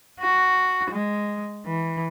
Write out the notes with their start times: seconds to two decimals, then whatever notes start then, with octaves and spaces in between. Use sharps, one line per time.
0.21 F#4
0.91 G#3
1.66 E3